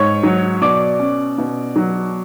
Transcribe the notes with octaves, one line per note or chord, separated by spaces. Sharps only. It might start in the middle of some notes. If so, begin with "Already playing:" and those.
Already playing: G#2 C#5 C#6
F#3
B2 D5 D6
C#4
B2
F#3